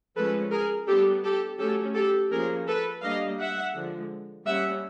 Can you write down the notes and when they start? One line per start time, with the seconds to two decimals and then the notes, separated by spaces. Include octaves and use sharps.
0.16 F3 G#3 C#4 A4 B4
0.52 G#4 A#4
0.87 G3 B3 D4 G4 A4
1.24 G4 A4
1.59 F#3 A3 C#4 G4 A4
1.95 G4 A4
2.31 F3 A#3 C#4 G#4 A#4
2.68 A4 B4
3.03 G3 A#3 D4 D#5 F5
3.39 E5 F#5
3.75 D3 F3 G#3
4.46 G3 A#3 C#4 E5 F#5